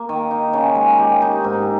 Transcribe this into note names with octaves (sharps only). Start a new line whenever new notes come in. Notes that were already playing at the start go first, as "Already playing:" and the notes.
Already playing: A#3
D#3
D#4
C#3
G#3
G4
D#4
G#2